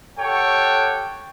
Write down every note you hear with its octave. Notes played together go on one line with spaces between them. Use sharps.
G4 A4 C#5 F#5 G5